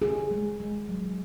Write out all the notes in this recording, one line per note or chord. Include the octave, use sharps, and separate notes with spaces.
C#3 G#4
G#3
G#3
F#3